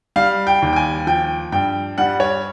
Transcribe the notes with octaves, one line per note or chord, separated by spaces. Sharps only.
G3 F5
G5
D#2
G5
G#5
F3 G5
G2 G5
G3 F#5
C#5